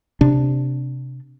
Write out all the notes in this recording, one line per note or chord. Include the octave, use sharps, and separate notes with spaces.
C3 D4